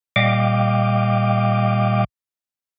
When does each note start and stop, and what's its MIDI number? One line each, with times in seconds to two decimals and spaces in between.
0.16 2.04 46
0.16 2.04 55
0.16 2.04 75
0.16 2.04 77
0.16 2.04 79
0.16 2.04 86